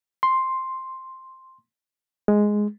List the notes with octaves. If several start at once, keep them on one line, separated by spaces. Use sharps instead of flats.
C6
G#3